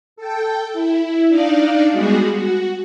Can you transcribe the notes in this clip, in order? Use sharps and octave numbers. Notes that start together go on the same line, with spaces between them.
A4 G5
E4
D4 D#4 D5 F5
G3 G#3 B3 F#4 G#4
F#4